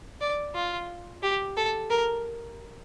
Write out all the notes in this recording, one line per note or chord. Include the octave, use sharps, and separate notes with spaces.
D5
F4
G4
A4
A#4